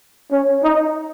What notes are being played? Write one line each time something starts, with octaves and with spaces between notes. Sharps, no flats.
C#4
D#4